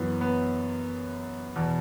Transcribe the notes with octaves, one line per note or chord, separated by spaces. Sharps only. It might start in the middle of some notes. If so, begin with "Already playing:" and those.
Already playing: F#2 E3 B3
B3
E2 B2